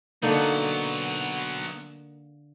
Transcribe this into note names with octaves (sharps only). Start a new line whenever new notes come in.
D3 F#3 A#3 B3 D#4